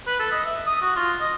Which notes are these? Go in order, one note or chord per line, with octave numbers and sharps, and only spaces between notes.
B4
A4
D#5
E5
D#6
F#4
F4
D#5